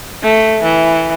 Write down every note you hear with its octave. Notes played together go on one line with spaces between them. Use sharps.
A3
E3